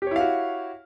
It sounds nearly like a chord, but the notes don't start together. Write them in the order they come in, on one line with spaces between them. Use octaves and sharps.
G4 C#5 E4 F5 F#4